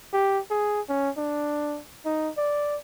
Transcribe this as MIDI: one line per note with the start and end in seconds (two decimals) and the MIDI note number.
0.13 0.40 67
0.51 0.81 68
0.89 1.10 61
1.17 1.80 62
2.05 2.30 63
2.37 2.78 74